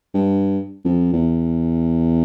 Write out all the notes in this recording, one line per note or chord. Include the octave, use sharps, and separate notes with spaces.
G2
F2
E2